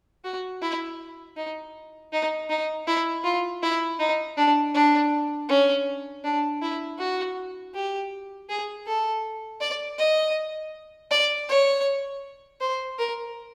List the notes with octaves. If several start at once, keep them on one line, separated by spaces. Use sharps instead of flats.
F#4
E4
D#4
D#4
D#4
E4
F4
E4
D#4
D4
D4
C#4
D4
E4
F#4
G4
G#4
A4
D5
D#5
D5
C#5
C5
A#4